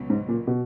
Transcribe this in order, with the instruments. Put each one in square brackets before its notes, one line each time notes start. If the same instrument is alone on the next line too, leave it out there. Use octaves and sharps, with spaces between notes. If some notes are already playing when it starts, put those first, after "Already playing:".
Already playing: [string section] C#2 B2 F#3
[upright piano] G#2
A#2
B2